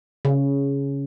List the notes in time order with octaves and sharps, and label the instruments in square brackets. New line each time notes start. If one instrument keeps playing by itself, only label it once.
[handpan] C#3